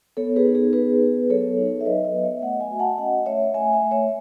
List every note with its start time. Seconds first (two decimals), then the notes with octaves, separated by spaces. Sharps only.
0.17 B3 A4 C#5
0.36 G#4 B4
0.45 D#4
0.55 G#4
0.73 B3 G#4 B4
1.02 B3
1.29 F#3 A4 C#5
1.58 D#4
1.81 E5
1.85 F#3 B4 D#5
2.05 B4 D#5
2.14 B3
2.23 C#5 E5
2.42 A3 D#5 F#5
2.61 E5 G#5
2.70 F#4
2.80 F#5 A5
2.98 C#4 D#5 F#5
3.26 A3 C#5 E5
3.54 A3 E5 G#5
3.73 E5 G#5
3.82 A3
3.91 C#5 E5